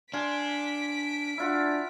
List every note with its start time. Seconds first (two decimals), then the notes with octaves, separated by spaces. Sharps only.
0.14 D4 F5 G#5 C6 B6 D7
1.38 D4 E4 F4 F#5